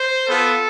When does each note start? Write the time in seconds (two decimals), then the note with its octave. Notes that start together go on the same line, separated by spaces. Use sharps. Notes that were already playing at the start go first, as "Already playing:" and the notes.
Already playing: C5
0.28 B3 F4 A4